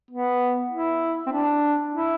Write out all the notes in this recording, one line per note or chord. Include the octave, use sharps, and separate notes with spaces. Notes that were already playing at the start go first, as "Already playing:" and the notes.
B3
E4
C4
D4
E4